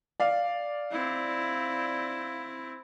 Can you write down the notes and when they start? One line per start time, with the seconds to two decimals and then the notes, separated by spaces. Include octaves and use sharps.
0.20 D5 F5
0.92 C4 E4